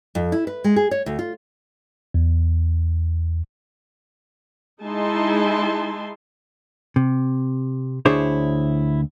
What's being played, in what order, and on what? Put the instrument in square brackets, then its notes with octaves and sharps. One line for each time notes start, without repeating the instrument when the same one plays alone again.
[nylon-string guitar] F2
E4
B4
G#3
G#4
C#5
D2
F4
[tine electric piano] E2
[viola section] G#3 D#4 E4 G#5 A5 C6
[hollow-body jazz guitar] C3
D2 D4 E4 G#4 C5 C#5